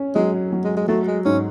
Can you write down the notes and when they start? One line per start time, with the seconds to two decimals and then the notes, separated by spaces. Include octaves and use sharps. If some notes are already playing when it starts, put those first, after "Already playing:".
Already playing: C#4
0.15 F#3 G#3
0.52 F#3
0.64 G#3
0.77 G#3
0.88 F#3 A3
1.07 G#3
1.25 G#2 C#4